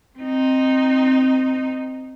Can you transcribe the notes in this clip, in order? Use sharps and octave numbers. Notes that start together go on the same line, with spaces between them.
C4 D#4